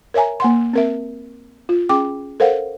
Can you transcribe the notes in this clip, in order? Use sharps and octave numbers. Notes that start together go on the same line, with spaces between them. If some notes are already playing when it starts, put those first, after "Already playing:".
A#4 C#5 E5 G#5 A#5
A#3 F#5 C6
C4 A#4 E5
F4
C#4 G#4 G5 D6
A4 A#4 C5 F5 F#5